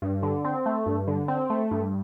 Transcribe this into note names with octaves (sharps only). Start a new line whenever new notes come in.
G2
D3
C4
A3
G2
D3
C4
A3
G2